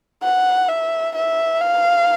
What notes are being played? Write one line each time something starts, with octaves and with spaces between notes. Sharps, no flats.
F#5
E5
E5
F5